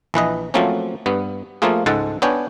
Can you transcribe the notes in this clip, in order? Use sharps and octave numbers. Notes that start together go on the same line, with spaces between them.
A#1 E3 B4 D#5
F3 F#3 A3 A#3 C4 C#4
G2 B3
F3 A3 A#3 F4 G#4
C#2 G#2 G#3 A4 F#5 A5
B3 D4 C#5 G5 G#5